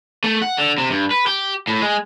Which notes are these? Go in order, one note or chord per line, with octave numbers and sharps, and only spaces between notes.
A3
F#5
D3
C3
G2
B4
G4
A2
G#3